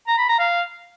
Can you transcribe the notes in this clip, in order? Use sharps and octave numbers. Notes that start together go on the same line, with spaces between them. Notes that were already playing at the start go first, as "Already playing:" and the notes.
A#5
B5
A#5
F5